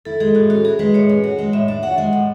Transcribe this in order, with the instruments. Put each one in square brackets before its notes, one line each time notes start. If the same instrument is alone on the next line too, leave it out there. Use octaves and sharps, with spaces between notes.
[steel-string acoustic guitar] E4 [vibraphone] A4
[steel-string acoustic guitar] G#3 [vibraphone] G#4
[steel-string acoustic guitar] A2 [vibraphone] F#4
[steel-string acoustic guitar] C#4 [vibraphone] F#4
[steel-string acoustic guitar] E4 [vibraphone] G#4
[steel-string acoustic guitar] G#3 [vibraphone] B4
[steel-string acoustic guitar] A2 [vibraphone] C#5
[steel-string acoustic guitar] C#4
F#4
G#3
[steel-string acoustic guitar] A2 [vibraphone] E5
[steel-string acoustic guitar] D4 [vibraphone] E5
[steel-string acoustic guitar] F#4 [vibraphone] F#5
[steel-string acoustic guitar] G#3 [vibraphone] F#5
[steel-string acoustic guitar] A2